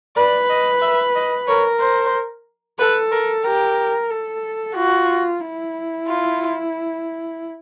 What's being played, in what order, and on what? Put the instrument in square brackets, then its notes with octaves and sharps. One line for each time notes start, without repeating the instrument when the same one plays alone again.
[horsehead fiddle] B4 [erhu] D5
[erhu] D#5
E5
D#5
[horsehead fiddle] A#4 [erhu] C#5
[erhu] C5
[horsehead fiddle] A4 [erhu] B4
[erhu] A#4
[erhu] G4 [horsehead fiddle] A#4
[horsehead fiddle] A4
[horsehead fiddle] F4 [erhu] F#4
[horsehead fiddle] E4
[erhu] F4